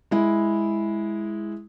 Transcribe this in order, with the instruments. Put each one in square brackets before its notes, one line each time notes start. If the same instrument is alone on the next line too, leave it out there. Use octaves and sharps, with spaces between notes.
[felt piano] G#3 E4